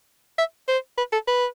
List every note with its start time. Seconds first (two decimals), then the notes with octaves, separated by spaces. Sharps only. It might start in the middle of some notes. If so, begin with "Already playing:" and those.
0.38 E5
0.68 C5
0.98 B4
1.13 A4
1.27 B4